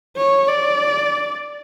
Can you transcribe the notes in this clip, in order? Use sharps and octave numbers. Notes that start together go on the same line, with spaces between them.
C#5
D5